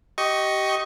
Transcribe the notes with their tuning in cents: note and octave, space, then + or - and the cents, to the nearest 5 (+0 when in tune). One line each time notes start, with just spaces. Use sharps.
G4 -20 D#5 +5 C#6 +0